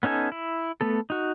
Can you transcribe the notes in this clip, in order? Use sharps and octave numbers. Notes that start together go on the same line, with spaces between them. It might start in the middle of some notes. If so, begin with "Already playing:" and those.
B3 C#4 D#4 A4 G#5
E4
A3 B3 A4
D#4 F#4